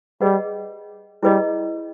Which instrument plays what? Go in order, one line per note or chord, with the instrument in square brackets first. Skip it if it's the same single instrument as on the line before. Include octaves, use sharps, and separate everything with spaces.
[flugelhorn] G3 [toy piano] G#4 B4 D#5 F#5
[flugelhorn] G3 [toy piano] E4 G#4 B4 D#5